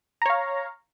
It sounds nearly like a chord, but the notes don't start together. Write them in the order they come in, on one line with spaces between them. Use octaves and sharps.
A#5 C#5 F5